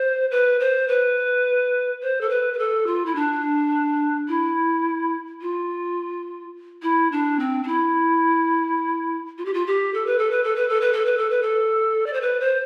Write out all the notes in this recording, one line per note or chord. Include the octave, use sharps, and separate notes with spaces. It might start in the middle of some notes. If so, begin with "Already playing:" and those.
Already playing: C5
B4
C5
B4
C5
A4
B4
B4
A4
F4
E4
D4
E4
F4
E4
D4
C4
D4
E4
F4
G4
F4
G4
A4
B4
A4
B4
A4
B4
A4
B4
A4
B4
A4
B4
A4
D5
C5
B4
C5